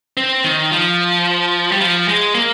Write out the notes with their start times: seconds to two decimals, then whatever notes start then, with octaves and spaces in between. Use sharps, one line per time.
0.17 C4
0.44 D#3
0.72 F3
1.72 G3
1.81 F3
2.08 G#3
2.35 A#3